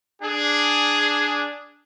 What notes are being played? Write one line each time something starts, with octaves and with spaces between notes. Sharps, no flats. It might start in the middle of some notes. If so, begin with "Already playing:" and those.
D4 G#4